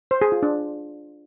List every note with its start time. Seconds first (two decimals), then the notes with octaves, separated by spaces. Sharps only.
0.11 C5
0.22 G#4
0.32 F4
0.43 D4